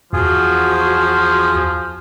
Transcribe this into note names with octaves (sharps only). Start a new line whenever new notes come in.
E2 F3 F4 F#4 G#4